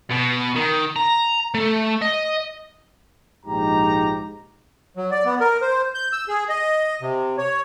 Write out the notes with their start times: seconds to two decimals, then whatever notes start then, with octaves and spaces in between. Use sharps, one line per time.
0.11 B2
0.56 D#3
0.96 A#5
1.54 A3
2.02 D#5
3.46 A#1 G#2 G#3 D#4 G4 A#5
4.97 F#3
5.11 D5
5.25 B3
5.41 A#4
5.62 C5
5.95 G6
6.12 E6
6.28 G#4
6.49 D#5
7.01 C3
7.38 C#5